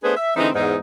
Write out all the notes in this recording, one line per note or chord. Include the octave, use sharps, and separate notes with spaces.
A3 B3 D4 G#4 B4 C5
E5
D3 E3 G#3 C4 D#4
E2 G#2 D#4